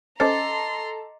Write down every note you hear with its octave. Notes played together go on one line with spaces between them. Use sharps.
C#4 A4 C5 D#5 A#5 C6 D6 A6